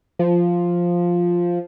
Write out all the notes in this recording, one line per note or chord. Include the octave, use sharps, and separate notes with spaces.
F3